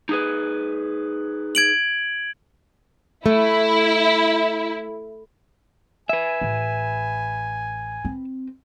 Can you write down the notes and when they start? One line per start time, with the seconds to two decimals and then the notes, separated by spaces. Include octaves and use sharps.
0.09 D#4 G#4 B4
1.55 G#6 D7 F#7
3.26 A3 E4
6.09 B4 E5 G#5
6.41 A1
8.05 C4